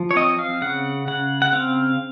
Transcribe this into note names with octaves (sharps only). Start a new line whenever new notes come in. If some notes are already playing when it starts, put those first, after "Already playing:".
Already playing: F3
C#5
C4 D#5
F5
C#3 F#5
C#3 F#5
F#5
C4 F5